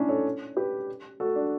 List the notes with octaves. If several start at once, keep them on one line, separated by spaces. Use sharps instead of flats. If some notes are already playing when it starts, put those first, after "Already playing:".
Already playing: C#4 D4 E4
A4 C#5
G4 B4
F#4 A4
D4